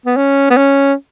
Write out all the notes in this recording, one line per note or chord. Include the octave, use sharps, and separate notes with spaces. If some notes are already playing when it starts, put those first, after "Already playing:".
B3
C#4
B3
C#4